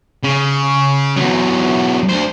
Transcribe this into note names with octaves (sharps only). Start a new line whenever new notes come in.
C#3
E2 F#3
D2 C5